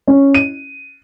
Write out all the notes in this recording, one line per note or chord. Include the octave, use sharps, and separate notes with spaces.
C#4
D#7